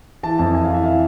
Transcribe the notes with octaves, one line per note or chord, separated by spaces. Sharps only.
E3 A5
F2 A5
E3 G#5
F5
E3 E5
E3 F5